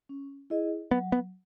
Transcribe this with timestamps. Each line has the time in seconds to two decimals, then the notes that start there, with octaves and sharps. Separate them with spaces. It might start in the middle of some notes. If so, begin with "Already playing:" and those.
0.09 C#4
0.50 E4 G#4 D#5
0.91 F#3 B3
1.12 B3